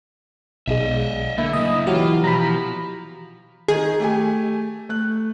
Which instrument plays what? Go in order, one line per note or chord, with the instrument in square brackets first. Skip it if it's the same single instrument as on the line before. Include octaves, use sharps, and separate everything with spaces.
[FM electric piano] B1 G#3 [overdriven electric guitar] D#5 E5
[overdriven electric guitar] D3 [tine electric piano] A#3 [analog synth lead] E4
[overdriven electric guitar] C#3 F#3 [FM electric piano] D#5
[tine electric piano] E3 G4 [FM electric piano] F#3 [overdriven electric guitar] F4
[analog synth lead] B2 [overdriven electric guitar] F3 [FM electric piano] A#5 B5
[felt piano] D#3 [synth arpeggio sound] G#4
[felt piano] A3 G4 G#5
A3 F#6